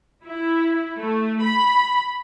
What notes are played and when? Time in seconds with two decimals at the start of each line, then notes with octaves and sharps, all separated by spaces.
0.25 E4
0.99 A3
1.43 B5